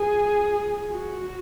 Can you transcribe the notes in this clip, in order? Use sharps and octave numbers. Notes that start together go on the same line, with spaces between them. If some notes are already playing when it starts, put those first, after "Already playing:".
Already playing: G#4
F#4